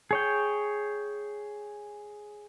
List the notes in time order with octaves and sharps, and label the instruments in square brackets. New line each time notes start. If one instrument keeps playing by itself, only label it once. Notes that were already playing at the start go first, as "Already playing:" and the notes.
[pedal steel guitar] G#4 C#5 G5